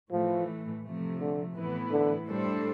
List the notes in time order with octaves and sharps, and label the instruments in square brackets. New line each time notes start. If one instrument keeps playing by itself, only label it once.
[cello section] A2 E3 A3 [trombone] F3
[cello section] C3 F3 A3
[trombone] D3
[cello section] A2 E3 B3 E4 B4
[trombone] D3
[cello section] A2 G3 D4 A4 C5